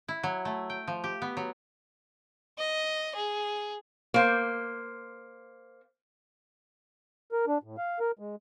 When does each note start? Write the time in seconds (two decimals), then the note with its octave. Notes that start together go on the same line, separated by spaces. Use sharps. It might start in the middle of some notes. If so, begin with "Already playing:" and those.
0.08 E4
0.23 F#3
0.45 A3
0.70 G5
0.88 F3
1.04 G4
1.22 B3
1.37 F#3
2.59 D#5
3.16 G#4
4.14 A#3 C5
7.32 A#4
7.47 D4
7.63 A2
7.78 F5
8.00 A#4
8.19 G#3